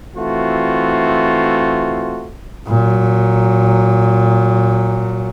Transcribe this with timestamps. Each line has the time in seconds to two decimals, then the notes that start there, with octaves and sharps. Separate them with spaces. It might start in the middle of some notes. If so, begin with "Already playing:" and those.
0.16 E3 A3 C4 F4 F#4
2.67 A#2 F#3